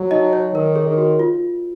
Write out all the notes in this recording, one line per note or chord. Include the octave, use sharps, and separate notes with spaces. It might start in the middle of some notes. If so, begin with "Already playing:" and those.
Already playing: F#3
D#4 D#5
C#5
D#3 A#4
G#4
D#3
F#4
F4